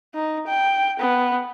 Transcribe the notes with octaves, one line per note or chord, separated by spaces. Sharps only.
D#4
G5
B3